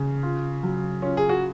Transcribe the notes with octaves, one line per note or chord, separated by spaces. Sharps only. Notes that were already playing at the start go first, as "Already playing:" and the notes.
Already playing: C#3
F4
F#3
C#4 F4
G#4
F#4